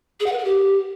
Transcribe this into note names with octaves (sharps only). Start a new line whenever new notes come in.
G#4
F#5
B4
A#4
G4